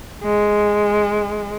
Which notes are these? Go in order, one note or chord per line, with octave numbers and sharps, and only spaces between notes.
G#3